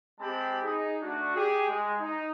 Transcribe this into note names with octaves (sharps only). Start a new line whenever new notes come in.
G#3 C4 G4 A5 B5
D#4 G#4
A3 D4 F#4
G4 G#4
G#3
D#4